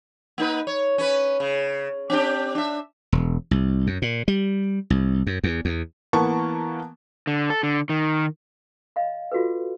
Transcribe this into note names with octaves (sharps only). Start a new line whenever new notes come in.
A#3 D#4 B4
C#5
C#4 B4
C#3
C4 D4 G4
D4 E5
E1
C2
F#2
A#2
G3
C2
F#2
E2
E2
E3 A#3 B3 A5 C#6
D3
A4
D3
D#3
D#5 F5 B5
F4 F#4 A4 B4